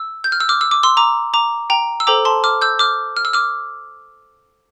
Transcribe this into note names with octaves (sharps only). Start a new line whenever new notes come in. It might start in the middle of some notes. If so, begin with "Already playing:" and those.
Already playing: E6
G6
F6
E6
D6 F6
E6
D6
C6 E6
A#5 D6
A#5 D6
G5 A#5
E6
A4 C5 G5 A#5 D6
A5 C6
D6 F6
E6 G6
D6 F6
F6
E6
D6 F6